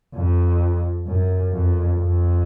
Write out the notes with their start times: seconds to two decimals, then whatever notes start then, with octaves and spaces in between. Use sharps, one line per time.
0.15 F2
1.07 F#2
1.53 F2
1.99 F2